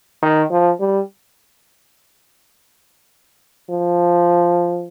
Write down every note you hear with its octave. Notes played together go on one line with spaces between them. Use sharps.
D#3
F3
G3
F3